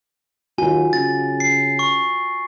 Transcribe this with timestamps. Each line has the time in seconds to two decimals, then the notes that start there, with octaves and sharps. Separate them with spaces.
0.58 D#2 F4 F#4 G#5
0.93 C#3 A6
1.40 C7
1.79 C#6